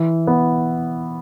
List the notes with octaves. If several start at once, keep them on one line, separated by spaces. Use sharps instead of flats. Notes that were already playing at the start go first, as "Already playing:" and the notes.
Already playing: E3
B3